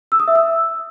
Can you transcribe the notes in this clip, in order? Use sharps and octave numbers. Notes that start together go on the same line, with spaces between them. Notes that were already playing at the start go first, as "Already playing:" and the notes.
E6
D#6
E5
E6